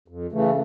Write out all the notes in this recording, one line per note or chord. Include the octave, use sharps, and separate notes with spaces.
F2
C#3 E3 A3